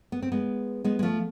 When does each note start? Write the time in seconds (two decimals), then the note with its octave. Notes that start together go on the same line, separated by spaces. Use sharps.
0.12 B3
0.22 C4
0.32 G#3 B3
0.84 G#3 B3
0.99 G#3
1.03 F3 A3